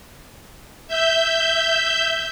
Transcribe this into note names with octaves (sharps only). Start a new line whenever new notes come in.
E5 G6